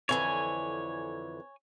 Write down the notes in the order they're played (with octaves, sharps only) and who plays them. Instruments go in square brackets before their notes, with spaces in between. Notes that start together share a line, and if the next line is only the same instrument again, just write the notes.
[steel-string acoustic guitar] F2 D3 E3 [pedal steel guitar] C#5 G#5